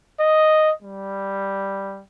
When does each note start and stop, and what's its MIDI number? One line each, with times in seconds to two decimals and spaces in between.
0.20 0.72 75
0.82 2.02 55